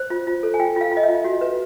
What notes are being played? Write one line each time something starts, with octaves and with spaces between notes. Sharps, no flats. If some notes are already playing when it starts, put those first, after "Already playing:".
Already playing: C5
F4
F4
A4
G#5
F4 G5
F4 F5
F4
D#5
E5
F4
F#4
B4